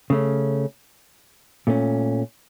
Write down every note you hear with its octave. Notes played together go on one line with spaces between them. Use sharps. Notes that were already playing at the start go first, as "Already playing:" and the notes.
C#3 A3 C#4
A#2 A3 C#4